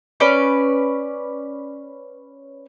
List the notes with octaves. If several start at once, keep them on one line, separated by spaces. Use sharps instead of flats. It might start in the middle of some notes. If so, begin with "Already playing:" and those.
C#4 B4 D5